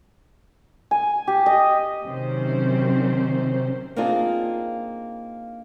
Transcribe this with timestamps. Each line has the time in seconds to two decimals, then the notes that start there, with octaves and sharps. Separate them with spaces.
0.91 G#5
1.28 G4
1.46 D#5
2.04 C3 D#3 F#3 C4 C#4 C5
3.96 A#3 C4 D4 D#4 F4 G#4